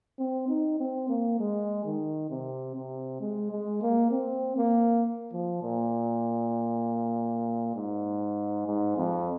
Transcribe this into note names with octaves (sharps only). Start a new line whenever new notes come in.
C4
D#4
C4
A#3
G#3
D#3
C3
C3
G#3
G#3
A#3
C4
A#3
F3
A#2
G#2
G#2
F2